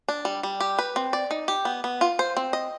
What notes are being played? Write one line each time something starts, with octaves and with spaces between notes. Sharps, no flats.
D4
G3
G3
G4
B4
C4
D5
D#4
G4
B3
B3
F4
C5
C4
D#5